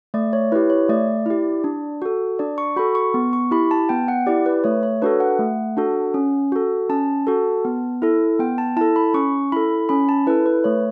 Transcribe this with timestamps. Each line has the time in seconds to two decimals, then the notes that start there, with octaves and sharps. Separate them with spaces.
0.14 A3 D5
0.33 C#5
0.52 E4 G4 B4
0.70 C#5
0.89 A3 D5
1.26 E4 G4
1.64 D4
2.02 F#4 A4
2.39 D4 D5
2.58 C#6
2.76 F#4 A4 B5
2.95 C#6
3.14 B3
3.33 C#6
3.51 E4 G4 B5
3.71 A5
3.89 B3 G5
4.08 F#5
4.26 E4 G4 D5
4.46 B4
4.64 A3 C#5
4.83 C#5
5.02 D4 F#4 A4 B4
5.20 F#5
5.39 A3
5.77 D4 F#4 A4
6.14 C#4
6.52 F#4 A4
6.89 C#4 A5
7.27 F#4 A4
7.65 B3
8.02 E4 A4
8.39 B3 G5
8.58 A5
8.77 E4 A4 A5
8.96 B5
9.14 C#4 C#6
9.52 E4 A4 B5
9.89 C#4 B5
10.09 A5
10.27 E4 A4 B4
10.46 B4
10.64 A3 C#5